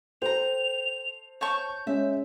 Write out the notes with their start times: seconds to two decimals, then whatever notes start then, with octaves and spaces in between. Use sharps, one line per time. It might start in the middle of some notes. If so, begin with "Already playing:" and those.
0.22 A4 C5 G5 A#5 F7
1.41 C#5 A5 C#6 G6
1.87 G#3 C#4 E5